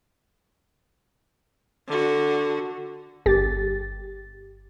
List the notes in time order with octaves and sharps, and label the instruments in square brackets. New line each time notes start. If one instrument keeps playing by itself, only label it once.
[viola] D3 F#4
[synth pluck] G1 G4 A6